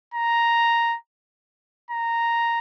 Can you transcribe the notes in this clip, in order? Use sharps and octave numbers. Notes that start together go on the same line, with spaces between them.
A#5
A#5